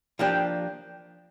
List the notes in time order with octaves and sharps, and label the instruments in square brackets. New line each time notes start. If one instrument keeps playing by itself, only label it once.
[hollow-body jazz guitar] F3 A#3 D4 G4 [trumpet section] G5